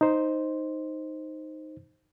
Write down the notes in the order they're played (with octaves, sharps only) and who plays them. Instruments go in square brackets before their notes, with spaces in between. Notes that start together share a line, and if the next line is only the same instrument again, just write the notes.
[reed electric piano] D#4 C5